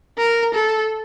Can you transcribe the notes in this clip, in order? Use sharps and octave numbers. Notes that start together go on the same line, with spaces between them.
A#4
A4